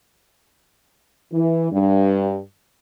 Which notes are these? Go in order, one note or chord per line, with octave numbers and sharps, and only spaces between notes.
E3
G2